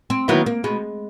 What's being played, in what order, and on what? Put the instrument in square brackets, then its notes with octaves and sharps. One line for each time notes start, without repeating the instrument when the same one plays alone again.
[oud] C4
[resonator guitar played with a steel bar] D#3 F#3 B3 E4 [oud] A#3
[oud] A#3
[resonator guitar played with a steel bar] B2 [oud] G#3